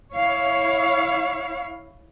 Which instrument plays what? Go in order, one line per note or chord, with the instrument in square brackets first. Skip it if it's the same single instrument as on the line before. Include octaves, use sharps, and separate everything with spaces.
[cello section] E4 C#5 F5